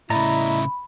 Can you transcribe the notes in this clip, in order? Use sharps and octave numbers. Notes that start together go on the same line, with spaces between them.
A2 C#3 E4 D5 D#5 A#5 B5